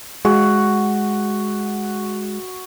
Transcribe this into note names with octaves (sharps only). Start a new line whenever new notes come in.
G#3 F#4